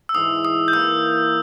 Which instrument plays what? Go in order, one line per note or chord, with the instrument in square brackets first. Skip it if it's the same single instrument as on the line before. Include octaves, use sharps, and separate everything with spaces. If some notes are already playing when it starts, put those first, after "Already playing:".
[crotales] E6
[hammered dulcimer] G#2 E3 G#3 [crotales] D#6
[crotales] D#6
G6
[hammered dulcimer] E3 A#3 E4 A#4 [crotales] E6